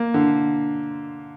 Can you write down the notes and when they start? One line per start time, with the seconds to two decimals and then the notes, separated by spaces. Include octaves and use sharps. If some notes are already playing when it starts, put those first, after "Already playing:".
Already playing: A#3
0.14 D3